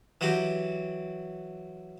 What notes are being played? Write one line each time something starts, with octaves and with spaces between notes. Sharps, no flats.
E3 F#3 F#4 G4